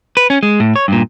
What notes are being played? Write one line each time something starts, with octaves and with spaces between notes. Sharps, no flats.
B4
C#4
G#3
A2
C#5
G2 A#2